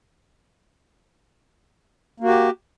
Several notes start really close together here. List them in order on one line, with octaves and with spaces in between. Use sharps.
A#3 F#4 G4